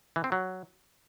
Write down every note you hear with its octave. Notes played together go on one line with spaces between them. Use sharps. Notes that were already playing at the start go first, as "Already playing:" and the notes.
E3
C4
F#3